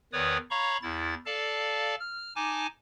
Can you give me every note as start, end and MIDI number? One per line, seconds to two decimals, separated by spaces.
0.13 0.38 40
0.13 0.38 51
0.13 0.38 71
0.13 0.38 73
0.13 0.38 74
0.13 0.38 87
0.50 0.77 73
0.50 0.77 77
0.50 0.77 82
0.50 0.77 83
0.50 0.77 85
0.82 1.15 40
0.82 1.15 64
0.82 1.15 93
1.26 1.95 69
1.26 1.95 74
1.26 1.95 77
1.26 1.95 81
2.00 2.34 89
2.36 2.67 63
2.36 2.67 80
2.36 2.67 81
2.36 2.67 86